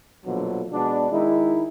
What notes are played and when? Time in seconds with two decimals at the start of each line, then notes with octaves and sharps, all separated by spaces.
0.24 A#1 B2 D3 F3 F#3
0.72 B2 G#3 B3 D4
1.11 D#3 G#3 D#4 E4